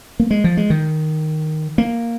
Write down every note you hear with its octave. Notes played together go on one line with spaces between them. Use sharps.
A#3
G#3
F3
G#3
D#3
A#3